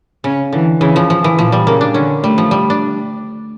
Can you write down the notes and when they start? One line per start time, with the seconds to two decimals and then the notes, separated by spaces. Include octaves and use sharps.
0.24 C#3 C#4
0.53 D3 E3
0.81 C#3 E3
0.96 F3
1.10 F3
1.24 E3
1.38 A#2 F3
1.52 G3
1.66 C#3 A#3
1.81 D4
1.94 D3 C#4
2.23 G3 A3
2.38 F3
2.51 G3
2.70 D4